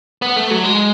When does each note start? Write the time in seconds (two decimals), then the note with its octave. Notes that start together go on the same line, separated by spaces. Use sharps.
0.22 B3
0.37 A3
0.51 F#3
0.64 G#3